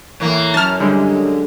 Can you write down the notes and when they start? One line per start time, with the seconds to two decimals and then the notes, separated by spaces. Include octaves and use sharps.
0.20 A2 E3 A#3
0.54 F#2 A5 F6
0.80 D3 G3 G#3